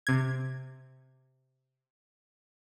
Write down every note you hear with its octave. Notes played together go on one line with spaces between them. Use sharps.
C3 G#6